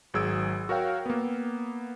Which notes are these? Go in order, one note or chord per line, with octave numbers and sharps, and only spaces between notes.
G#1 F#3 G#4 E6 G#6 D7
F#4 A#4 C#5 F5 G5
A#3 B3